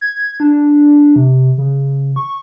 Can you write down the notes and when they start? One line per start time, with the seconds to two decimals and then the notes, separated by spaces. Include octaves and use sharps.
0.01 G#6
0.40 D4
1.16 C3
1.58 C#3
2.16 C#6